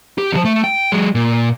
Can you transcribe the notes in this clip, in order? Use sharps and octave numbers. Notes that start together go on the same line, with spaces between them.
G4
E2 F3
A3
G5
F#3 G#3
A#2